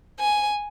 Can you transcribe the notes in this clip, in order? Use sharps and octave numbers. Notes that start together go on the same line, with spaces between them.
G#5